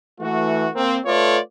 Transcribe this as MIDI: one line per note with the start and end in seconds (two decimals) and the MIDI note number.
0.19 0.67 52
0.19 0.67 57
0.19 0.67 66
0.75 0.98 58
0.75 0.98 60
1.06 1.39 57
1.06 1.39 65
1.06 1.39 69
1.06 1.39 71
1.06 1.39 73
1.06 1.39 74